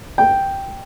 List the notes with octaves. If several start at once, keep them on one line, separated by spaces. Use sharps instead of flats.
G5